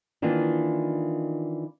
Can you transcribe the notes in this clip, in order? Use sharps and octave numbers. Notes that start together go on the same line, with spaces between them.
D#3 E3 A#3 D4 F4